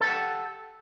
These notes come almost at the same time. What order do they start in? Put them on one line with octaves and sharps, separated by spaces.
A4 G4 F#5